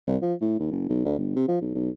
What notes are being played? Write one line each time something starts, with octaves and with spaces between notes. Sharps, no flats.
C2
F3
A2
D#2
F#1
B1
D2
G1
C3
F3
B1
B1